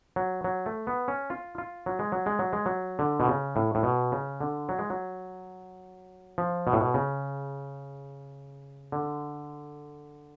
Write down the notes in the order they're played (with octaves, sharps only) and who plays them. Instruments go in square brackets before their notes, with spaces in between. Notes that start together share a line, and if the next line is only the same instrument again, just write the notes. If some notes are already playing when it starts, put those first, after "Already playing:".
[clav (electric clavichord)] F#3
F#3
A3
B3
C#4
F4
F4
F#3
G#3
F#3
G#3
F#3
G#3
F#3
D3
B2
C#3
A2
A2
B2
C#3
D3
F#3
G#3
F#3
F3
B2
A2
B2
C#3
D3